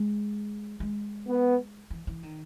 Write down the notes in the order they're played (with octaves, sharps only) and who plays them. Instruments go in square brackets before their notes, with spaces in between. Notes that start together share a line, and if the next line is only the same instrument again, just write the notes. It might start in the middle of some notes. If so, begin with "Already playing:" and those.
Already playing: [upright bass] G#3
G#3
[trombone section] B3
[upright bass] E3
E3
D#3